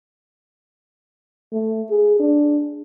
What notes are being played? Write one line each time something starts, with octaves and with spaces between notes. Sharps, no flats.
A3
G#4
D4